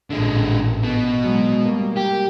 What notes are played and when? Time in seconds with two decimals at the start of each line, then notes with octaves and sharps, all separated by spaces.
0.10 A1 A#2 D3 G#3
0.84 B2
1.22 F#3 G#3
1.62 G3 A#3
1.97 G4